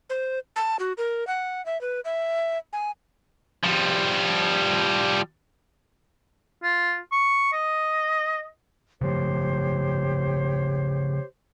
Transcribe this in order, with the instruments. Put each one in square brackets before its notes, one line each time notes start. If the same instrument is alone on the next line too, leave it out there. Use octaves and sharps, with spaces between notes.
[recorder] C5
A5
F#4
A#4
F#5
E5
B4
E5
G#5
[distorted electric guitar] F3 G3
[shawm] F4
C#6
D#5
[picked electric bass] C#3 F3 A3 [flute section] G4 C5 C#5